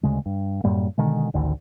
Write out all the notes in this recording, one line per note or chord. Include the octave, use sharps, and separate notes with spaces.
D2 C#3 G#3
G2
F#2 A2 G3 A#3
B2 D3 D#3 G#3
A1 D2 D3 D#3